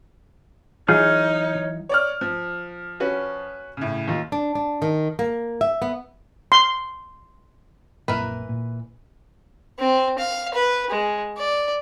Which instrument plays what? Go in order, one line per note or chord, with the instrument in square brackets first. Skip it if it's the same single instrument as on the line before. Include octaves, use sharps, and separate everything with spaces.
[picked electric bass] E3 F#3 [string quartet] D#4 [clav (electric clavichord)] F4 G#4 [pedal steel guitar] C#5 F6 G6
[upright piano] C#5 D5 F6
F3
[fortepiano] C#4 F#4 B4
[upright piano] A2 C#3
[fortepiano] D#2 F4
[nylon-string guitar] D4
D4
D#3
A#3
E5
B3
[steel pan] C6
[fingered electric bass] A#1 F#2 A#3 [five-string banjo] E3 A#4 B4
[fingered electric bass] A#2
[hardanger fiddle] C4
F5
B4
G#3
D5